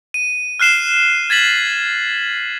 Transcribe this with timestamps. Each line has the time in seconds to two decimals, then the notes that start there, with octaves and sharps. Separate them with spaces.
0.14 D#7
0.60 F6 F#6 C7 E7 G7
1.30 G#6 A6 B6 F#7